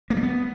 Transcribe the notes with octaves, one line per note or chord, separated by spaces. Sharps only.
A#3
G3
B3